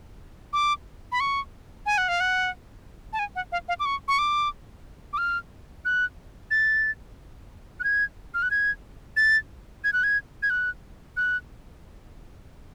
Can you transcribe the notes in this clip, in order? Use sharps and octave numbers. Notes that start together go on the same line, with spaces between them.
D6
B5
C#6
G#5
F#5
F5
F#5
A5
G#5
F#5
F5
F5
D6
C#6
C#6
D6
D6
F6
F#6
A6
F#6
G#6
F6
F#6
G#6
A6
G#6
F#6
G#6
G#6
F#6
F#6